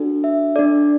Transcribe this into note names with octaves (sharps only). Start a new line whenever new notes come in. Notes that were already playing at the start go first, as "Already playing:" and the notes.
Already playing: D4 F#4 A4
E5
D4 A4 D5